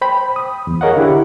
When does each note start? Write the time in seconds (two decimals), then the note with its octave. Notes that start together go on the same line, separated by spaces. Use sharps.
0.01 C5 G5 B5
0.36 D#6
0.67 E2
0.81 G#4 A#4 C#5 D#5 F5 F#5
0.96 D3 D4 E4 G4